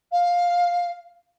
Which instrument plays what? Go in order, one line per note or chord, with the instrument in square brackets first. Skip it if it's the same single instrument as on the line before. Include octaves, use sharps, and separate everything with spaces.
[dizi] F5